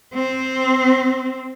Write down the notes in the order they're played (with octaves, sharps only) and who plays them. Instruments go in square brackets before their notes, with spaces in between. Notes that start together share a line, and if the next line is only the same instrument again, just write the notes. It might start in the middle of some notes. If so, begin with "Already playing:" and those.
[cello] C4